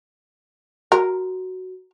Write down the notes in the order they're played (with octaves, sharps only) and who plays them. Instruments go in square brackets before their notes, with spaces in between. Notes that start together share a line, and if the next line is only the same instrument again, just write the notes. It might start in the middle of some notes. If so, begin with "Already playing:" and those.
[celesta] F#4 [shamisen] A#4